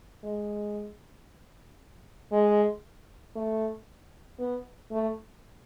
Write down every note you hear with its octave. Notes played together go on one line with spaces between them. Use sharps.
G#3
G#3
A3
B3
A3